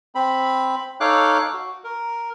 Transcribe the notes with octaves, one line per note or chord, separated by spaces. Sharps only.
C4 B5
D#4 A4 C#5 F5 D6 F#6
F#4
A#4